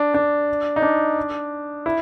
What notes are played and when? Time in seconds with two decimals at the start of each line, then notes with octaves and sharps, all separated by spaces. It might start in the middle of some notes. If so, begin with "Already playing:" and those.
Already playing: D4
0.14 D4
0.76 D#4
0.83 D4
1.86 E4